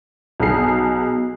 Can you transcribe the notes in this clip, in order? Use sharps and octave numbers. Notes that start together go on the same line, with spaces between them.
B1 B2 G#4 C7